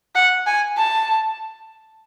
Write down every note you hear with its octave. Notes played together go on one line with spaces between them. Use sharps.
F#5
G#5
A5